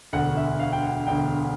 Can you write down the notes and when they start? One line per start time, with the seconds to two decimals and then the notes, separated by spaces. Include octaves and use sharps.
0.13 E1 D2 D3 F#5
0.37 E5
0.60 F5
0.72 G5
0.83 F#5
1.07 E1 D2 D3 G5